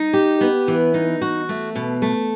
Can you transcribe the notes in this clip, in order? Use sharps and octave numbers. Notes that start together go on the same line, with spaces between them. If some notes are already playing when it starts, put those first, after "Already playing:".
Already playing: D#4
G4
B3
E3
D#4
F#4
A3
B2
A3